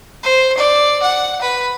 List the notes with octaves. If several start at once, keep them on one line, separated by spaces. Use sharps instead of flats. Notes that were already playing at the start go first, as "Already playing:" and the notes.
C5
D5
F#5
B4